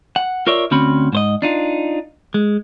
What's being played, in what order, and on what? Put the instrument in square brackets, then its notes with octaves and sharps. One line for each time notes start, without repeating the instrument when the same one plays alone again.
[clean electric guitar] F#5
F4 A#4 C#5 D5 E5
D2 C4 C#4 F#4 B5
G#2 C5 D#5
D4 D#4 F4
G#3